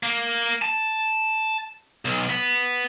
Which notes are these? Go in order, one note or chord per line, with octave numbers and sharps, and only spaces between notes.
A#3
A5
B1
B3